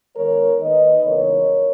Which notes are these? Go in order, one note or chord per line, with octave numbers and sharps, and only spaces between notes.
D#3 G#3 B3 D#4 A#4 C#5
D#3 A#3 D#4 B4 D#5
C#3 E3 G#3 B3 D#4 A#4 C#5